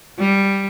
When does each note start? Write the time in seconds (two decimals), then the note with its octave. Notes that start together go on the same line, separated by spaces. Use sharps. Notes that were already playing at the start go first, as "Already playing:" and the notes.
0.19 G3